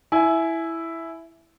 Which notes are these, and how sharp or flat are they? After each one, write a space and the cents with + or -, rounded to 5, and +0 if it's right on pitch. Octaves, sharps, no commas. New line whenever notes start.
E4 +0 G#5 +20